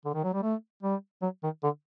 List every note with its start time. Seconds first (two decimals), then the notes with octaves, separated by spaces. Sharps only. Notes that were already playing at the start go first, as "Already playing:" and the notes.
0.05 D3
0.14 D#3
0.24 F#3
0.33 G3
0.42 A3
0.83 G3
1.22 F#3
1.43 D#3
1.63 D3